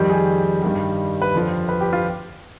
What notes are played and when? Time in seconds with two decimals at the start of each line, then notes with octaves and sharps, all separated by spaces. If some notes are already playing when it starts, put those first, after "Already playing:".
Already playing: F2 D#3 G3
0.10 G#4
0.62 G2 D#3 G3
1.22 B4
1.34 F2 D3 F3
1.69 B4
1.81 G4
1.93 F4